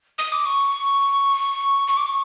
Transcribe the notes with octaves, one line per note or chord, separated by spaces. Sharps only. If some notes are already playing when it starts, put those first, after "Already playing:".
D#6
D6
C#6
C#6
D6
C#6